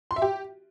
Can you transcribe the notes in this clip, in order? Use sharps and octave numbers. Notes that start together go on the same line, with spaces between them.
C6
E5
G4